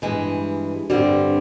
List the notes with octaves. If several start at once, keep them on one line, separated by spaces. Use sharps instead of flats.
G2 E3 G#3
G2 D3 G3 C4